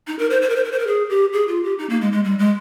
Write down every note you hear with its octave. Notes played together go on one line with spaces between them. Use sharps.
D#4
A#4
C5
C5
A#4
C5
A#4
C5
A#4
G#4
G4
G#4
F4
G4
D#4
A#3
G#3
G#3
G3
G#3